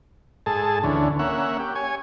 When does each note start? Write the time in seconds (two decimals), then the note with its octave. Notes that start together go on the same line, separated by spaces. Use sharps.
0.46 G#2 G#4 A4 A5
0.84 D2 D3 E3 C#4
1.19 A#3 C#4 E5 F#5
1.60 G4
1.75 C#5 G#5